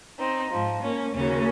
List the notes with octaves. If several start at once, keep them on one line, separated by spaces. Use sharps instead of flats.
C4 D#4
G#2 F3
A#3 C#4
D#2 C#3 F#3 A#3 C#4